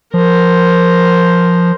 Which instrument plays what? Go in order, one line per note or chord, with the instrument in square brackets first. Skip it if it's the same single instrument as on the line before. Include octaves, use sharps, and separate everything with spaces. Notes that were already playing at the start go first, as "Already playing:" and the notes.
[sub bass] F3 [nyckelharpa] A#4 C5